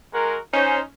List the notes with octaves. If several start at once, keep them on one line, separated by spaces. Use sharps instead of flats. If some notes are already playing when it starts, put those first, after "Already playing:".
G#3 F#4 A#4
C#4 D#4 C5